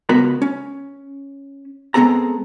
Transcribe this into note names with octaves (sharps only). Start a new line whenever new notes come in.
C#2 B3 F#4 A#4 B5
C#4
G#3 B3 C4 G#4 A4 A#5